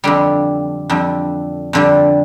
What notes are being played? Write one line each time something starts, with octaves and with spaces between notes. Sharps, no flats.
F2 D3 G3
F2 D3 G3
F2 D3 G3